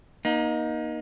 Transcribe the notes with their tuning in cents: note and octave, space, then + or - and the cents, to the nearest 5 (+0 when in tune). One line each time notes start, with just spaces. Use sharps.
A#3 +30 D#4 +0